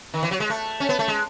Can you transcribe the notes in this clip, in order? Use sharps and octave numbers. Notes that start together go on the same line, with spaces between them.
D#3
E3
F#3
G#3
A3
C#4
B3
A3
G#3